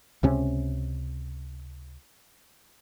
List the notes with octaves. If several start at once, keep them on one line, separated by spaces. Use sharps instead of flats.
C#2 C3 C#4